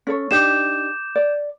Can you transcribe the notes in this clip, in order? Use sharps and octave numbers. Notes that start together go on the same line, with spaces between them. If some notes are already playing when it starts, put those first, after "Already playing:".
C#4 A4 C#5
D4 D#4 G4 D6 G6 E7
D5